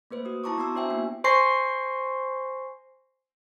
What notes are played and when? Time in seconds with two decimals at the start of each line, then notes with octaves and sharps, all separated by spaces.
0.11 A3 A#3 B4 C5
0.25 F#4 D#6
0.44 E4 A5 A#5 C#6 D6
0.58 B3 F#4 A#5 C6 D6 E6
0.75 D4 F#4 C5 E5 G5 G#5
0.90 A#3 B3 E4
1.24 C5 G#5 C6 C#6 A#6 C7